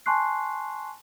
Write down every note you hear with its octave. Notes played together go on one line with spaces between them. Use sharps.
G#5 A5 C6 C#6 F#6 C7